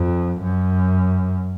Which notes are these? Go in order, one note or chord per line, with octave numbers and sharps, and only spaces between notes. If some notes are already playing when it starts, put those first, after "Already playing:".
Already playing: F2
F#2